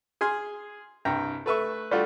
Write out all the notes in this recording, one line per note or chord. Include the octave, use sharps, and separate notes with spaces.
G#4 G#5 C6 F6
C2 G2 G5 A#5
A3 B4 E5 C#6
G3 A3 D4 F4 F#4